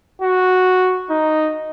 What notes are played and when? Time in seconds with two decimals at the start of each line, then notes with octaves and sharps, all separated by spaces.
0.22 F#4
1.10 D#4